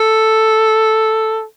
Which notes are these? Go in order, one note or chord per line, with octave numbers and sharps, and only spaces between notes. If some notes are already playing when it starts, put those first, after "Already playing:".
Already playing: A4